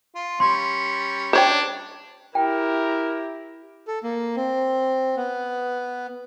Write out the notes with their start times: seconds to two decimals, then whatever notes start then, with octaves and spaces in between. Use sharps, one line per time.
0.15 F4
0.40 G3 C#4 C6
1.33 D4 C5 C#5 G5
2.35 E4 G4 A#4 G5
3.88 A4
4.04 A#3
4.36 C4
5.17 B3